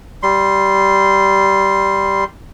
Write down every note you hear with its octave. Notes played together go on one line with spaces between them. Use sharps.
G3 C6